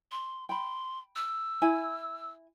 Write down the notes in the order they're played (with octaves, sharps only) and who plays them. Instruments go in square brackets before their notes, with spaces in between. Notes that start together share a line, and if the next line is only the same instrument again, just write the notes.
[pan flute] C6
[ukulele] G5 B5 [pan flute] C6
[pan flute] E6
[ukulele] E4 G#5